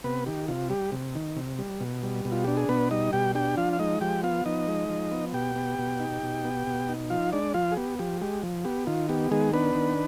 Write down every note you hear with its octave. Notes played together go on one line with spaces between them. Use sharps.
C3 B3 B4
D#3 G4
C3 F4
G3 G4
C3
D#3
C3
G3
B2
G3
B2
F4
D4 G4
G#4
B2 B3 B4
G3 D#4 D#5
B2 G4 G5
D4 G4 G5
F3 F4 F5
F5
G#3 D#4 D#5
F3 G4 G5
B3 F4 F5
F3 D#4 D#5
G#3
F3
B3
B2 G4 G5
B3
B2
D#4
B2
B3
B2
D#4
F3 F4 F5
G#3 D4 D5
F3 F4 F5
G#4
B3 G4
F3 G4
G#3 G4
F3
B3 G4
D#3 F4
B3 G4
D#3 G#3 G#4
B3 D4 B4
D#3